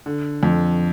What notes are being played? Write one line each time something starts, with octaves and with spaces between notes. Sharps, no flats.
D3
F2